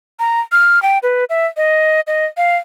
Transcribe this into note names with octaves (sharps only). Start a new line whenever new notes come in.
A#5
F6
G5
B4
E5
D#5
D#5
F5